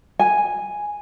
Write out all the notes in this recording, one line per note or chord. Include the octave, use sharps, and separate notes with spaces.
G#5